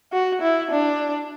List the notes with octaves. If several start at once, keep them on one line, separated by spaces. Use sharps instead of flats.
F#4
E4
D4